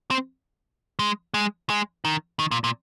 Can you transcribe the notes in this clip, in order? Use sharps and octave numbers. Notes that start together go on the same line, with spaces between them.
C4
G#3
G#3
G#3
D#3
D#3
A#2
A#2